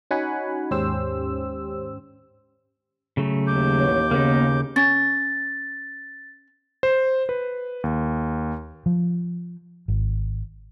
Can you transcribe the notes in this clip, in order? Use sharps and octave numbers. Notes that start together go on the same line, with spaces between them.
C#4 D#4 F#4 F#5 G#5 B5
D#2 G#2 C#4 G4 C5 E6
C#3 F#3 A3
D#2 D6 G6
A1 B3 C#5
C#3 A#3 B3 D#4
C#4 A6
C5
B4
D#2
F3
G#1